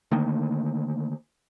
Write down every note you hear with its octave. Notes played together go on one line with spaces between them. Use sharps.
D3 D#3 A3 A#3